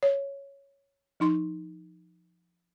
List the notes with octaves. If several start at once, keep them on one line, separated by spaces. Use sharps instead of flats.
C#5
F3 D#4 C6